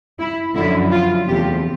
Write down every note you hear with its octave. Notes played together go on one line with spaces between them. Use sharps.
E4
F#2 D3 F3 E4
F4
E2 C3 F3 A3 C4 G4